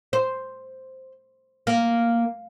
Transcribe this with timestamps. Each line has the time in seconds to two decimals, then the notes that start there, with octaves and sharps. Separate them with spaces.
0.13 C5
1.67 A#3